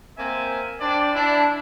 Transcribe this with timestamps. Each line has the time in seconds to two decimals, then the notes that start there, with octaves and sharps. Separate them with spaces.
0.17 A#3 C4 E5 G#5
0.80 C4 D4 C5 D5
1.14 D4 E4